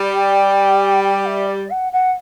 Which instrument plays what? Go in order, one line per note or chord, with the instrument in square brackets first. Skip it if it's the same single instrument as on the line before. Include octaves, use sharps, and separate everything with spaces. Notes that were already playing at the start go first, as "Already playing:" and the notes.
Already playing: [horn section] G3
[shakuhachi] G5
G5
E5
D5
F#5
F#5